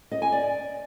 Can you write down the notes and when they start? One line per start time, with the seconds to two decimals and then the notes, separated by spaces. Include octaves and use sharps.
0.12 D#5
0.22 G#5
0.32 D5